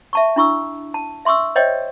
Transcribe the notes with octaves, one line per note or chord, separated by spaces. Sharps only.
E5 A5 C#6
D4 E4 C#6 E6
A5
E5 C6 C#6 D#6 E6
C5 C#5 D#5 E5 G5